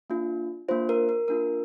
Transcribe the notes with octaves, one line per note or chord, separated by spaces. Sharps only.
A#3 D4 F4
A#3 D4 F4 C5
A#4
A#4
A#3 D4 F4 A#4